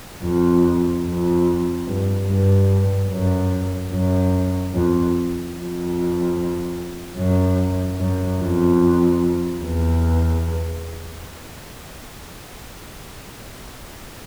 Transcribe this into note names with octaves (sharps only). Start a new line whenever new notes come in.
F2
F2
G2
G2
F#2
F#2
F2
F2
F#2
F#2
F2
E2